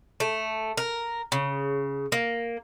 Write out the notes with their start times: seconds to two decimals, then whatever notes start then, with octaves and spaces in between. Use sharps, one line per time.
0.20 A3
0.77 A#4
1.32 C#3
2.12 A#3